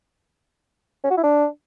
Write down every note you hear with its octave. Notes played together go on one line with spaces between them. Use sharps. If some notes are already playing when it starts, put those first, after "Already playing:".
C#4
F#4
E4
D4